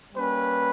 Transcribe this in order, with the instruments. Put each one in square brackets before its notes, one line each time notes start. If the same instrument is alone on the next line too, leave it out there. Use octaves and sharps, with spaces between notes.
[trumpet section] G3 A#3 C#4 B4